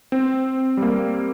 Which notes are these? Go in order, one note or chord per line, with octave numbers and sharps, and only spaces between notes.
C4
G3
A#3